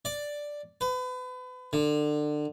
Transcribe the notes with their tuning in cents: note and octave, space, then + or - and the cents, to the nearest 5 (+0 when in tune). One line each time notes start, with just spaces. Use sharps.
D5 +0
B4 +35
D3 +25